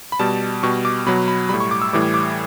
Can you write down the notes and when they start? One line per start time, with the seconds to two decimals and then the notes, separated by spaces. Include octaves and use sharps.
0.12 B5
0.19 B2 G3 A5
0.63 B2 G3 C#6
0.85 D6
1.06 B2 F#3 B5
1.28 B5
1.49 A2 G3 B5
1.60 C#6
1.71 D6
1.82 E6
1.93 A2 E3 G3 D6
2.14 D6